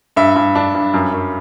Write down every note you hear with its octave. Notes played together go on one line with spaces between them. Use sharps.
G2 E5
G2
D4
G2
F#2
F#2